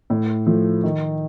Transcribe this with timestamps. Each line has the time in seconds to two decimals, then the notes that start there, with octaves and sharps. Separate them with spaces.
0.10 A2
0.47 F3 A3
0.84 D#3